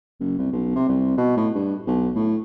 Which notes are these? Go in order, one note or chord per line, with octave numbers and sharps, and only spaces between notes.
F#1
C2
B1
C3
C2
B2
A2
G2
B1
A2